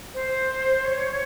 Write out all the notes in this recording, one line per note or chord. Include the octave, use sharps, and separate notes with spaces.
C5
C#5